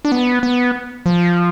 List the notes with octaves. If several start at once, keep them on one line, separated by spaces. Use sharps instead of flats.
D4
B3
B3
F3